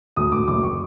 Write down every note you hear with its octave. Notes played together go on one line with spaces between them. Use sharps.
D2 D#6
D2 D6
F#1 D6
C#6